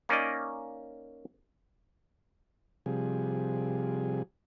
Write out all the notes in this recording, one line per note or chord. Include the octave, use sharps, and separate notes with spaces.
A#3 C#4 D#4 D5 D#5
C3 F3 G3 G#4